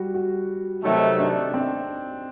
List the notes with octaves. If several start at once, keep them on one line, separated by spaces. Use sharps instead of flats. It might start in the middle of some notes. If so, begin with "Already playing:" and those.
Already playing: G3 F#4
F#4
C3 D#3 F#3 A3 D#4
D4
C4